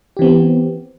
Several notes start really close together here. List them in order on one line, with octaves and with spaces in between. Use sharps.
G4 E3 C4 B3